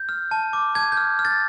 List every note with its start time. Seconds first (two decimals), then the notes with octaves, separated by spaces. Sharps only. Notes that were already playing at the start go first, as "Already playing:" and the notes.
Already playing: G6
0.09 F6
0.31 A5
0.53 D6
0.75 A5 G#6
0.92 G6
0.97 F6
1.19 F6
1.25 A6